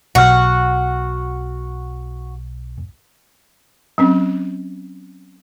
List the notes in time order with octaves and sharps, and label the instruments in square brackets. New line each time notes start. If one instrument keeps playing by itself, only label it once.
[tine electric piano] B1 F6 [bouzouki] F#4
[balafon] F#3 C4 C#4